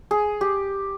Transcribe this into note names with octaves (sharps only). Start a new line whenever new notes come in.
G#4
G4